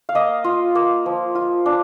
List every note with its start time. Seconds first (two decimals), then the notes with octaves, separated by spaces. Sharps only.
0.09 F5
0.15 A#3 D#5
0.44 F4
0.75 A#3
1.06 F3
1.35 F4
1.66 D4